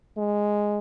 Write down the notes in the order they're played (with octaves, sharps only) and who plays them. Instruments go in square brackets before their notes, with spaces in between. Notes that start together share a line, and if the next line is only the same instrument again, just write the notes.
[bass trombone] G#3